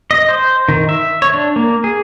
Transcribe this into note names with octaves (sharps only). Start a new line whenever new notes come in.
D#5
C5
D#3
E5
C#5
D4
A#3
G#4